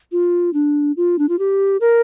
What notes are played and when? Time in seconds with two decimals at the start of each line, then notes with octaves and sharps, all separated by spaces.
0.12 F4
0.54 D4
0.97 F4
1.19 D4
1.29 F4
1.39 G4
1.81 A#4